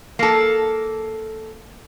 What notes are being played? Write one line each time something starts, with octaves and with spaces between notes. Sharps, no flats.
A#3 A4